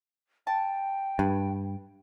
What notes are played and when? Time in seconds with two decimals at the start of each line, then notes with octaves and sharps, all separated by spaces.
0.47 G5 A5
1.19 G2 B4